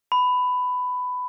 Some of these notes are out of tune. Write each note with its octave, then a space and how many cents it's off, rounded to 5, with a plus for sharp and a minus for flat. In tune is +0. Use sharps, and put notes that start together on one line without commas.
B5 +15